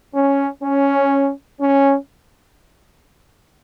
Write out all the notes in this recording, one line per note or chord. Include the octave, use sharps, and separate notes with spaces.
C#4
C#4
C#4